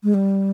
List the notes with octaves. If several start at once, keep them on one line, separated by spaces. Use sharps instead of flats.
G#3
G3